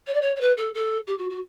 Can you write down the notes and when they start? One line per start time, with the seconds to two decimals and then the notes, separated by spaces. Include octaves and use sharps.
0.06 C#5
0.13 D5
0.21 C#5
0.35 C#5
0.40 B4
0.57 A4
0.74 A4
1.07 G4
1.18 F#4
1.29 F#4